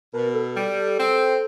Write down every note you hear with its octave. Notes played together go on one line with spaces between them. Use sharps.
B2 A#4
A4
G3
C4